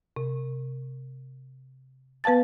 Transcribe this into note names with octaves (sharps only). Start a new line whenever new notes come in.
C3
B3 B4 F5 A5 A6